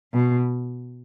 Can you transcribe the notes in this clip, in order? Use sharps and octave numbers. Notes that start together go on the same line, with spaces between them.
B2